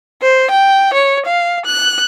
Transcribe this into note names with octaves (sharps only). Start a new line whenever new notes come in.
C5
G5
C#5
F5
F#6